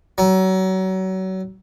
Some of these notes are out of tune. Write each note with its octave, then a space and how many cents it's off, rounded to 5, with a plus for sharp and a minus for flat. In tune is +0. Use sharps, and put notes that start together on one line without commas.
F#3 +30